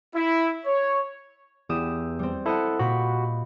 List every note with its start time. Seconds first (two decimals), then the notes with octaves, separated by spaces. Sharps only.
0.14 E4
0.65 C#5
1.69 E2 G4 D#6 E6
2.19 G3 C4
2.46 E4 A4 C5 D#5 F#5
2.79 A#2 F#4 G4 B5